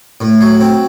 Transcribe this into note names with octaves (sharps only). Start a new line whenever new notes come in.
A2
F#3
C4